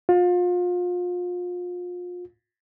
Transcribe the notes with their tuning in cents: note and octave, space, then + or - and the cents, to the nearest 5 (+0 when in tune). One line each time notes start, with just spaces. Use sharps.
F4 +35